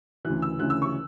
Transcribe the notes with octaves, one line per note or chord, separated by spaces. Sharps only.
D2 C#3 E3 F#6
E6
D2 C#3 E3 F#6
E6
C#6